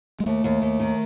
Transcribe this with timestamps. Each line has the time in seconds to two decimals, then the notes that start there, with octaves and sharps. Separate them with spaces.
0.20 G#3
0.26 D#2 A3
0.44 D#2
0.62 D#2
0.80 D#3